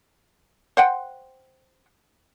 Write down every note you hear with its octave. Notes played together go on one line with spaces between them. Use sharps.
C5 F#5 G5